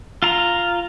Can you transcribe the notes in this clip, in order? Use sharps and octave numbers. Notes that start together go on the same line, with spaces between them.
F4 A#5